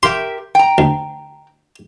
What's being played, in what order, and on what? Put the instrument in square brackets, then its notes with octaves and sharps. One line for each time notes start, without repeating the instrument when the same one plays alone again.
[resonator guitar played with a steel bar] G4 A#4 E5 [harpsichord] C6
[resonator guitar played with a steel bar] G5 A#5
[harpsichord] D2